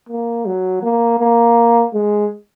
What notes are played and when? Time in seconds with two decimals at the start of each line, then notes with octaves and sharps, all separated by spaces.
0.09 A#3
0.46 F#3
0.83 A#3
1.19 A#3
1.94 G#3